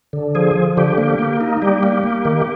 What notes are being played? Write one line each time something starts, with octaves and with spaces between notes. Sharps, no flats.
D3
F3 G#4
F3
D3 G4
A#3
A#3
D#4
G3 G4
A#3
A#3
D#3